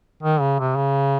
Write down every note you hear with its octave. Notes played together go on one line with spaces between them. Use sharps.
D#3
C#3
C3
C#3